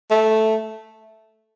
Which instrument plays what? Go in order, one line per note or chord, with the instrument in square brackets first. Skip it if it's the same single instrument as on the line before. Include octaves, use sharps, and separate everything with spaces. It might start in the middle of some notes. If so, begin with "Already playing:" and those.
[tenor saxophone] A3